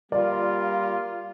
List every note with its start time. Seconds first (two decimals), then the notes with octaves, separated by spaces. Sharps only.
0.12 G3 A#3 F4 D5